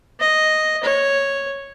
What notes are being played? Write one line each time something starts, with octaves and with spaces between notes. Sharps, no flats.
D#5
C#5